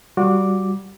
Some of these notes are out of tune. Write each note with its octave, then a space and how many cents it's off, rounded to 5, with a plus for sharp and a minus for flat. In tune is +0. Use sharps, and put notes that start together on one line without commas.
G3 -20 F#4 -25 D6 +0